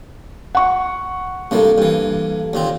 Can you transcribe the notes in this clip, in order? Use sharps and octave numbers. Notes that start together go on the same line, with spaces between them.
F#5 C#6
G2 C3 G3 A#3 A4
G2 E3
D#2 A#2 C4